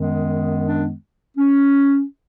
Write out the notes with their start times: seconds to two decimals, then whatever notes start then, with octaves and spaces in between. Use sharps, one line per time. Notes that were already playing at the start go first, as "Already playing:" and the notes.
Already playing: F#2 D#3 G#3 B3
0.63 D4
1.36 C#4